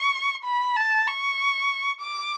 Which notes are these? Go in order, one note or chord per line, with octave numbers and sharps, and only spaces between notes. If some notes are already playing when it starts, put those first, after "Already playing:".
Already playing: C#6
B5
A5
C#6
D6